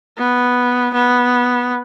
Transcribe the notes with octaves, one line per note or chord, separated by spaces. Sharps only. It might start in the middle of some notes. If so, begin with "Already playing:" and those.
B3
B3